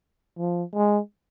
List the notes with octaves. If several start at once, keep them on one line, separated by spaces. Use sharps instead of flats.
F3
G#3